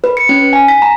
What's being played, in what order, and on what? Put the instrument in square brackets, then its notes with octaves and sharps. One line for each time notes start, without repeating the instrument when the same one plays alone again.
[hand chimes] B4
C#7
C#4
G#5
B6
A#5